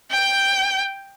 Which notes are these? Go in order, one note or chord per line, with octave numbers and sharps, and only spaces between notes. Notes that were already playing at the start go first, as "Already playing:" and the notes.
G5 G6